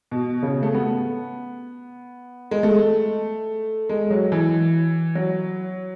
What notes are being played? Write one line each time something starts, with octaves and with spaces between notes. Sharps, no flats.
B2
C#3
A3
B3
G#3
A3
G#3
F#3
E3
F#3